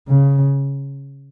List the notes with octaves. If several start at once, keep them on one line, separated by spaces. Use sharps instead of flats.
C#3